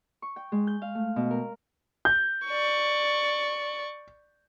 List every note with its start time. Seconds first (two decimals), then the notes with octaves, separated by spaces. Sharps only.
0.22 C#6
0.36 G5
0.52 G#3
0.67 G6
0.82 F5
0.95 A3
1.16 B2
1.31 A#4
2.05 G6
2.47 D5 C#6